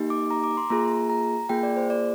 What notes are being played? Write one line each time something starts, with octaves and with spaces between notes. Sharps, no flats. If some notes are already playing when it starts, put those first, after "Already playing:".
Already playing: A#3 D#4 G4
D6
A#5
D6
C6
A#3 F4 G#4 A#5
A#5
A#3 F4 G#4 G5
D5
C5
D5